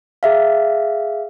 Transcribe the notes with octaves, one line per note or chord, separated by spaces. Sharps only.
G#4 E5 F5